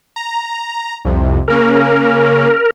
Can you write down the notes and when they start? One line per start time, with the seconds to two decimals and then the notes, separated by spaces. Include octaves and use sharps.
0.16 A#5
1.05 C2 F2 C3
1.48 C#3 A#3 C#4 A#4